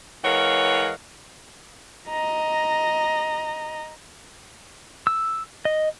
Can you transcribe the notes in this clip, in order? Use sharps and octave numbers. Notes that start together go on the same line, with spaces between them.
E3 G#3 A#4 C#5 F5 F#5
D#5 A#5
E6
D#5